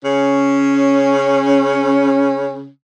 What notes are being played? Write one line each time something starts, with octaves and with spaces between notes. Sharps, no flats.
C#3 C#4